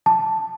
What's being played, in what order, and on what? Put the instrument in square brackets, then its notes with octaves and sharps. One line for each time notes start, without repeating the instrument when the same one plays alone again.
[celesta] A5